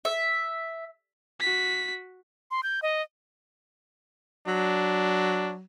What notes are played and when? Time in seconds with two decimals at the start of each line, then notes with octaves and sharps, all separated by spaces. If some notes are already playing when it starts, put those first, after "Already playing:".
0.05 E5
1.40 F#4 B6
2.51 C6
2.63 G6
2.82 D#5
4.47 F#3 D4